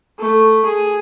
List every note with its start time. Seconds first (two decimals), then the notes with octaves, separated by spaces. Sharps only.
0.19 A3
0.65 G#4